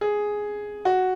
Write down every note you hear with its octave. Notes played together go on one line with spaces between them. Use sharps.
G#4
F#4